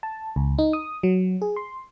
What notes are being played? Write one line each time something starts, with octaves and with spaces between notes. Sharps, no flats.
A5
C#2
D#4
D#6
F#3
G#4
C6